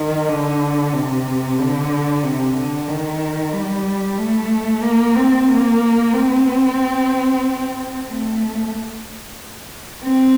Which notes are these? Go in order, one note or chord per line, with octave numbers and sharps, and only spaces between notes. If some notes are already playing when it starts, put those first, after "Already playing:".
Already playing: D#3
D3
C3
D3
C3
D3
D#3
G3
A3
A#3
C4
A#3
C4
A3
C4